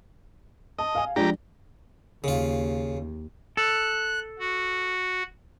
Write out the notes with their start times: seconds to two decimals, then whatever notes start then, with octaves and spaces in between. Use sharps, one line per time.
0.79 D#5 A5
0.95 F5 G#5
1.16 F3 G#3 D4 G4 A#5
2.24 D#2 C#3 F4
3.57 A4 F#6
4.39 F#4